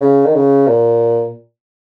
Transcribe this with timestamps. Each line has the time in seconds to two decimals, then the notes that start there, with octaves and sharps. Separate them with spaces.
0.01 C#3
0.25 D#3
0.35 C#3
0.68 A#2